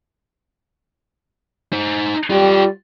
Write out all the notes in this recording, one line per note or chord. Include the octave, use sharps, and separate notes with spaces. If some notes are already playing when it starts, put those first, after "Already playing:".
D#4 C5
G3 F4 G5